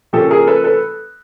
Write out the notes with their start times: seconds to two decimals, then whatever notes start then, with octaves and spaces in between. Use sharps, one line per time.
0.13 C#3 F3 A#3 C#4 G4 A4
0.31 G#4 A#4
0.47 A4 B4
0.64 A4 B4